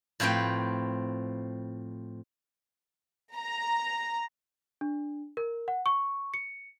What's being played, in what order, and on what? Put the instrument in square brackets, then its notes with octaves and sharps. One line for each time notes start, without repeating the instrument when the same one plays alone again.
[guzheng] A2 F3 C4 B4 G5
[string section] A#5
[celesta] D4
A#4
F#5
C#6
C#7